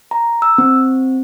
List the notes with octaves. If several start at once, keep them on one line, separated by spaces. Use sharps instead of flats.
A#5
E6
C4